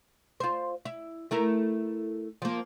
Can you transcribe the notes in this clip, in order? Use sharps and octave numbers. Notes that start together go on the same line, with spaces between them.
F4 C5
E4
A3 E4 A#4
F3 A#3